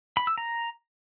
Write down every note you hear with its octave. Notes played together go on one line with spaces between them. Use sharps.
B5
E6
A#5